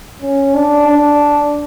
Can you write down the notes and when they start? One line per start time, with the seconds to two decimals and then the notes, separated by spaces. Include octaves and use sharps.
0.21 C#4
0.54 D4
0.88 D4